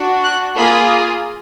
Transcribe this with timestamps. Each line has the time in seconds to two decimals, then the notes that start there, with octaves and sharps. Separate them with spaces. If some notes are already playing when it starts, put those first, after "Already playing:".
Already playing: D4 F#4
0.24 F#6
0.57 A#3 F4 G#4 B5